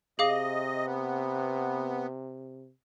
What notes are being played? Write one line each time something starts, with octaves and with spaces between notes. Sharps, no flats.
C3 G#4 D#5 F5 D6
B3